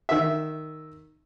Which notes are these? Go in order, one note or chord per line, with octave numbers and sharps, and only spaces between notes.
D#3 E5